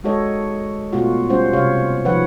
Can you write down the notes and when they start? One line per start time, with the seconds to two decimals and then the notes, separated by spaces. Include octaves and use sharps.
0.04 G#3 F#4 A4 C#5 D#5
0.93 B2 A3 F4 F#4
1.29 G3 C#4 F4 C5 F#5
1.53 C3 C#5 F5
2.05 D#3 F3 B4 C#5 F#5